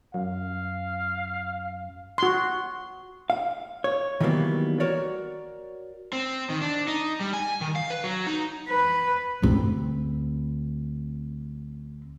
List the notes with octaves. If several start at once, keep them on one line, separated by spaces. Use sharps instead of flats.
F#2 F5
F#4 C6
F5
C#5
D#3 E3 F#3 G3 A#3 B3
F#4 A#4 C#5 D5
C4
D#3
D4
D#4
G3
G#5
D#3
F5
B4
F#3
D#4
B4
D2 C4